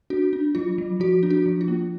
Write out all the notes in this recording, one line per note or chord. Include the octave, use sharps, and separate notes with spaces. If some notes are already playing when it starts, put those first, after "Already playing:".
D4 F#4
D4
F#3 F4
F#3
F3 F#4
D4
F#4
F3
F4
A#3